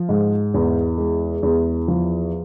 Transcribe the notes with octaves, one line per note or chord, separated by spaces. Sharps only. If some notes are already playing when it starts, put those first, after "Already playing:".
Already playing: F3
G#2
E2
G#3
E2
F3